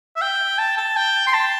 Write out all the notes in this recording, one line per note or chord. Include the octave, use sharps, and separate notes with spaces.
E5
G5
A5
A5
G5
C6
A5